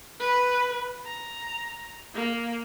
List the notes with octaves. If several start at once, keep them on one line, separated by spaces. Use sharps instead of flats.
B4
A#5
A#3